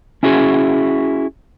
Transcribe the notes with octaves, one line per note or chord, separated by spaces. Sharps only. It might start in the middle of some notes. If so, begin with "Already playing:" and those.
C#4 E4 F#4 G#4